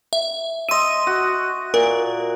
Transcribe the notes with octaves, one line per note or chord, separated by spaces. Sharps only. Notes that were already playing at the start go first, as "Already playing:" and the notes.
E5
D#5 E5 C6 D#7
F#4
A#2 A#4